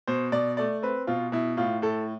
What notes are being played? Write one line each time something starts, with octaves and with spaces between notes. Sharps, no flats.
B2 C5
B2 D5
A3 D5
C4 B4
B2 F4
B2 E4
A2 F4
A2 A4